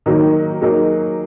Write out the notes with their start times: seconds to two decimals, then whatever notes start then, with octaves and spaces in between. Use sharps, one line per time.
0.06 D#3 F#3 A#3 D#4
0.62 F#3 A#3 D#4 G#4